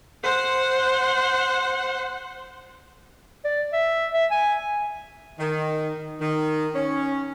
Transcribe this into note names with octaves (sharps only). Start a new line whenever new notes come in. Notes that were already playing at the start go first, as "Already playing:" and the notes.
C5 F#5
D5
E5
E5
G#5
D#3
D#3
C#4